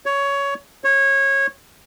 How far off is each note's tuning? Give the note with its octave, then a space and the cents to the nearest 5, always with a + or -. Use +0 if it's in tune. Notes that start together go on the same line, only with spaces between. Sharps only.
C#5 +15
C#5 -20